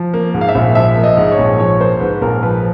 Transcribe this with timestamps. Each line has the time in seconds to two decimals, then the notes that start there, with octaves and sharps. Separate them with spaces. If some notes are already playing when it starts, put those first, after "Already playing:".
Already playing: F3
0.14 A#3
0.34 G#2
0.41 F5
0.49 E5
0.55 A#1
0.75 F3 E5
0.97 A#3
1.04 D#5
1.17 G#2
1.32 C#5
1.39 A#1
1.59 F3 C#5
1.80 A#3 C5
2.00 G#2 B4
2.21 A#1 A#4
2.43 F3 B4